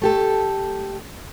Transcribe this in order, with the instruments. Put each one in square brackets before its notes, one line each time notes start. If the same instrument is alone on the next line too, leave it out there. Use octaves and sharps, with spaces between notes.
[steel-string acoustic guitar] A3 G4 A4